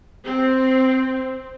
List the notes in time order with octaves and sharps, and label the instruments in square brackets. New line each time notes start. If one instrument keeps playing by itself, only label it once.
[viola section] C4